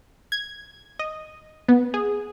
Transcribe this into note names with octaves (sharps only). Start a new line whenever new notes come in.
G#6
D#5
B3
G#4